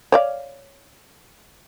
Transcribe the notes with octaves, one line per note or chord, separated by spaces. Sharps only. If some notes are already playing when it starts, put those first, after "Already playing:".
C#5 D5 F5